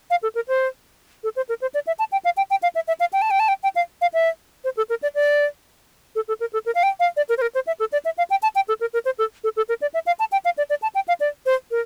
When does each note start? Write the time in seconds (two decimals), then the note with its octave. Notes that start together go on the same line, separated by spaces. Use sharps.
0.10 F5
0.23 A4
0.35 A#4
0.48 C5
1.23 A4
1.36 C5
1.49 A#4
1.61 C5
1.74 D5
1.87 E5
1.99 A5
2.12 G5
2.24 F5
2.37 G5
2.50 G5
2.63 F5
2.75 E5
2.87 E5
3.00 F5
3.13 G5
3.22 A5
3.30 G5
3.39 A5
3.48 G5
3.63 G5
3.75 F5
4.01 F5
4.14 E5
4.64 C5
4.77 A4
4.89 A#4
5.02 D5
5.15 D5
6.15 A4
6.28 A4
6.40 A#4
6.53 A4
6.66 A#4
6.75 F5
6.83 G5
7.00 F5
7.16 D5
7.29 A#4
7.38 C5
7.41 A#4
7.55 C5
7.67 E5
7.79 A4
7.92 D5
8.05 E5
8.18 F5
8.30 G5
8.42 A5
8.55 G5
8.68 A4
8.81 A#4
8.93 A#4
9.05 C5
9.18 A4
9.44 A4
9.56 A4
9.69 A#4
9.81 D5
9.94 E5
10.06 F5
10.19 A5
10.32 G5
10.45 F5
10.57 D5
10.70 D5
10.82 A5
10.95 G5
11.08 F5
11.20 D5
11.46 C5
11.71 A#4